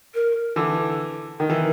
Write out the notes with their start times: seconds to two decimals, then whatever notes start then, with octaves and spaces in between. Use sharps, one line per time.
0.15 A#4
0.56 D3 E3
1.39 D#3 A#4
1.50 E3